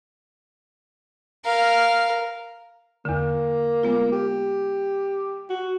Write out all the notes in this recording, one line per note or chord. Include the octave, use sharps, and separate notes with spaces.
A#4 F5
E2 D3 A#3
G#3 B3 F4
G4
F#4